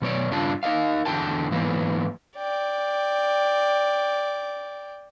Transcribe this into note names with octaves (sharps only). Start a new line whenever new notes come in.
B2 F#3 C#5 D5
G2 C#3 D4 F4 A5
D#4 A#4 D#5 F5
E2 D3 F#4 G5 A5
G#2 E3 F#3 A#3 B3
D5 G5